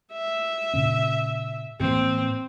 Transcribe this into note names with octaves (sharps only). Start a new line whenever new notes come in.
E5
A#2 C#3 C#4
A2 E3 A#3 C4